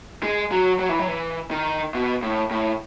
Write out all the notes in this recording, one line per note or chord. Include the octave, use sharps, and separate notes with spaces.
G#3
F#3
F#3
E3
F#3
E3
D#3
B2
A2
A2